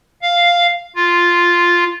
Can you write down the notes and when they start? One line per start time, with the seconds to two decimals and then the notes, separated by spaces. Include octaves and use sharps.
0.22 F5
0.96 F4